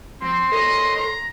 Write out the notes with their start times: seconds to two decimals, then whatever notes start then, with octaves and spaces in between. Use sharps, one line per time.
0.22 F3 C4 C6
0.52 A4 A#4 C#5 D#5
0.97 A#5